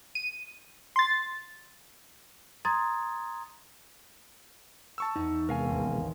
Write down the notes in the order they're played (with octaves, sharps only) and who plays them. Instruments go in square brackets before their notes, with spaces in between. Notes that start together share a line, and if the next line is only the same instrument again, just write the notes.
[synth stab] D#7
C6 A6
[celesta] A#5 C6 D#6 G#6 A6
[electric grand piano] A5 C#6 E6
[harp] E2 [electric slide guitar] D#4
[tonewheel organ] C3 G#3 B3 [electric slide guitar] A#4 F5 G#5
[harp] A1 D#2